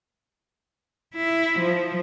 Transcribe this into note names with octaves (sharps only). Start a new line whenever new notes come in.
E4
F3